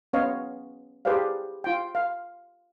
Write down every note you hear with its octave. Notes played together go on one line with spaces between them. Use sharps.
B3 C#4 C#5 D#5 F5
G4 G#4 B4 C5 D5 F5
F4 G5
F5